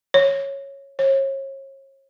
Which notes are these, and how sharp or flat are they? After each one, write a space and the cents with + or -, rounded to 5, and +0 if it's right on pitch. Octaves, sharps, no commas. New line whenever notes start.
C#5 -10
C#5 -35